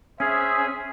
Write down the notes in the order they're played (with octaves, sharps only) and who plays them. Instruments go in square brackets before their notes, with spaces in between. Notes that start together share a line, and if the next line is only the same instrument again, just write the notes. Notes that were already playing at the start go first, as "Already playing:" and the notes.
[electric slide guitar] C#4 [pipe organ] G#4 [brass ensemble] C5 E5